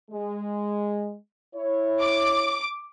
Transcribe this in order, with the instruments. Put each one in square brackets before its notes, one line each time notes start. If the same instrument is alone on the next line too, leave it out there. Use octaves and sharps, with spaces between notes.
[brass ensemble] G#3
E4 C#5
[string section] D6